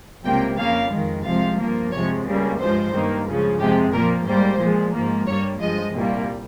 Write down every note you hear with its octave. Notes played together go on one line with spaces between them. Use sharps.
C#2 C3 G3 A#3 G5
F2 C#3 F3 A#3 F5
F2 D#3 G#3
C2 C3 F3 G#3 F5
G2 F3 A#3
F2 C3 F3 G#3 C#5
C#2 C#3 G3 A#3
G2 F3 G#3 C5
G2 D#3 A#3
C#2 C#3 F3
F2 C3 F3 G#3 G4
A#2 F3 A#3 A#4
G#2 G3 A#3 C5
A#2 F3 G#3
G#2 F3 A#3
G2 G3 A#3 C#5
G2 F3 G#3 D#5
C2 A#2 G3 A#3